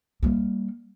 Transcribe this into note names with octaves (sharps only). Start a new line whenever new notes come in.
G3 A#3